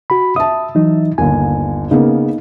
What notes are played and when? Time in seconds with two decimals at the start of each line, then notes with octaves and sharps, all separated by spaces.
0.10 F#4 B5
0.36 E5 A5 D#6
0.75 E3 F#3 D#4
1.18 G1 D#2 G#5
1.91 C#3 A#3 B3 D#4